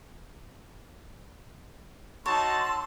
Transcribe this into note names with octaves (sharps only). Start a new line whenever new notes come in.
D#4 F#4 C#5 A5 C6 E6